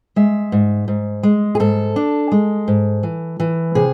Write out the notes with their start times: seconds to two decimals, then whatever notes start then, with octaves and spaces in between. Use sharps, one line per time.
0.16 G#3 E5
0.52 G#2
0.88 G#2
1.23 G#3
1.55 G#4
1.60 G#2 A4
1.96 D4
2.32 G#3
2.68 G#2
3.03 E3
3.40 E3
3.75 C3 G#4